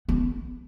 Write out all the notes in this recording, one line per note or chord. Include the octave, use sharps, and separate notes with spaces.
B3